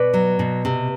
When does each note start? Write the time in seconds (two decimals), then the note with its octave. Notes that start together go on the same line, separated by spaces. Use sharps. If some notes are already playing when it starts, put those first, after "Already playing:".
Already playing: B2 B4 D5
0.14 F#3
0.39 B2
0.65 C3